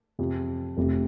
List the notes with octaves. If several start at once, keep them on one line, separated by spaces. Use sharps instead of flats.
F2 C3 F3
F1 F2 C3